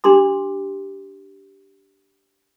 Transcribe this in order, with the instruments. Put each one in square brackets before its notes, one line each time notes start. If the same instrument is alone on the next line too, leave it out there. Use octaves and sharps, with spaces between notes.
[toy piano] D4 G4 C6 D6